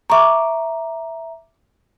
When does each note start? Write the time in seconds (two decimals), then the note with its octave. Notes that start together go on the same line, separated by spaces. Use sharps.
0.10 E5 A#5 C#6 D6